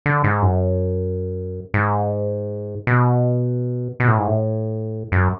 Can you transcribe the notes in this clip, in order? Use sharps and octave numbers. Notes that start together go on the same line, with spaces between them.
D3
G#2
F#2
G#2
B2
B2
A2
G#2
A2
F#2